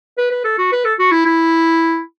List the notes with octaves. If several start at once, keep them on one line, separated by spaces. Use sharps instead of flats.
B4
B4
A4
F#4
B4
A4
F#4
E4
E4